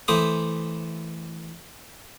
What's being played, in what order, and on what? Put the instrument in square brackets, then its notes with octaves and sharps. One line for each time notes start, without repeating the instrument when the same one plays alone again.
[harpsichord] E3 A3 C5 D6 D#6